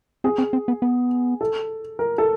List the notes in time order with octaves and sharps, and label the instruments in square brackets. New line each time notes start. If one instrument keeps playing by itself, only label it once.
[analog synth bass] C4 [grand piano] G#4
[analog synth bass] C4
C4
B3
B3
[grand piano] A4
A#4
A4